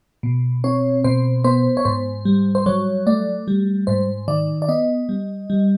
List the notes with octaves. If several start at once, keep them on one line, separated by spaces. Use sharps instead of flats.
B2
C4 C#5
B2 C5
B3 C5
C#5
G#2 C5
G3
C5
F#3 C#5
A3 D5
G3
G#2 C5
D#3 D5
D5
B3 D#5
G3
G3